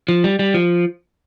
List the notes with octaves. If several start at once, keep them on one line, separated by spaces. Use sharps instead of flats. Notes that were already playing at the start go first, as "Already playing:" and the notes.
F3
G3
G3
F3